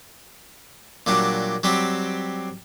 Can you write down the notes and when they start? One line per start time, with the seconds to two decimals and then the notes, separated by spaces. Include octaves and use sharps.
1.07 A#2 F#3 G3 D4
1.63 F#3 G3 C4 G4